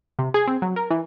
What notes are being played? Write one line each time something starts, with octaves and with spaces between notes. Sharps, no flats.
C3
G#4
C4
F#3
A#4
E3